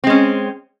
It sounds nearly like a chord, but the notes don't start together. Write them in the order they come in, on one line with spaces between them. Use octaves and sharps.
C4 G#3 C#4